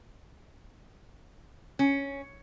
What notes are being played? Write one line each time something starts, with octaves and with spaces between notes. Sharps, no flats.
C#4